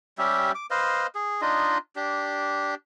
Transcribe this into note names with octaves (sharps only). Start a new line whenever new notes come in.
G3 C#4 G4 E5
D6
B4 C5 D#5 F5
G#4
D4 D#4 F4 D#5
D4 G4